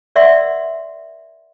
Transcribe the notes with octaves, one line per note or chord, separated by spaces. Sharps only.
A#4 D5 E5 F#5 C6